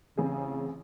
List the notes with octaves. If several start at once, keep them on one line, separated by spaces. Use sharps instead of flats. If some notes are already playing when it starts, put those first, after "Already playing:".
A1 C#3 C4 G#4